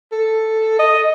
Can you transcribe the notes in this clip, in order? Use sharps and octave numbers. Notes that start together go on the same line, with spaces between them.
A4
D#5